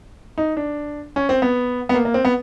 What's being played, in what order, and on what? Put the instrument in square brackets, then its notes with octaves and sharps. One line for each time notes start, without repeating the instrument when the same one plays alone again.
[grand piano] D#4
D4
C#4
C4
B3
B3
A#3
A#3
C4
B3